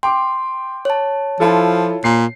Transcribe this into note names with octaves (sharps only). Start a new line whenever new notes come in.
G5 C6 D6
C#5 A5
F3 E4 F4 A4
A#2 C7